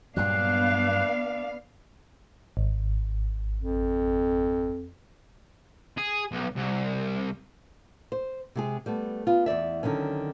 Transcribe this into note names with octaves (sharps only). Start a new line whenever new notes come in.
G2 A#2 F#3 B3 D4 F5 F#6
G#1
F2
G#4
B1
C2
C5
C3 G#3 G#4
G3 A3 B3
B3 F4
E2 G2 D5 E5
D3 D#3 F#3 C#4